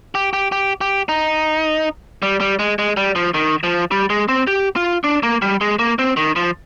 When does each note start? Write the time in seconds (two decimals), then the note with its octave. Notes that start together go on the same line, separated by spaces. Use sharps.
0.15 G4
0.33 G4
0.52 G4
0.81 G4
1.09 D#4
2.23 G3
2.41 G3
2.59 G#3
2.79 G#3
2.97 G3
3.16 F3
3.34 D#3
3.64 F3
3.91 G3
4.10 G#3
4.29 C4
4.47 G4
4.76 F4
5.04 D4
5.23 A#3
5.42 G3
5.61 G#3
5.79 A#3
5.99 C4
6.17 D#3
6.36 F3